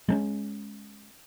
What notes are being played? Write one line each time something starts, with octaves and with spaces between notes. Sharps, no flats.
G#3 A3 C#4